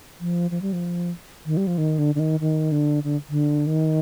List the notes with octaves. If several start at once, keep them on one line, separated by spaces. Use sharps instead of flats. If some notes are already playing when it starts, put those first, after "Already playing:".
F3
F3
G3
F3
D#3
G3
F3
D#3
D3
D3
D#3
D#3
D3
D3
D3
D#3